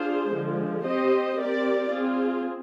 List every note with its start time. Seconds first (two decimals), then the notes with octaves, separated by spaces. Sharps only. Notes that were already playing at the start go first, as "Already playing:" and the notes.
Already playing: D4 F4 G#4 C5
0.30 D3 F3 G#3
0.84 C4 G4 C5 D#5
1.37 C4 G4 A#4 D5
1.91 C4 F4 G#4